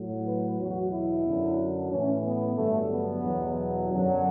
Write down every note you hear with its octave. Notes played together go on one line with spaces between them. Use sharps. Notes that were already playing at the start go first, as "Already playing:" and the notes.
Already playing: A2 F#3
B4
E2 B2 F#3 F#4
E4
F#2 D3 F#3
A2 E3 C#4
B3
G2 D3 F#3 A3
B3
E2 B2 F#3
F#2 D3 F#3